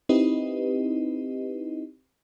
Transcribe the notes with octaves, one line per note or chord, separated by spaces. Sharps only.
C4 D#4 E4 G4 B4 D#5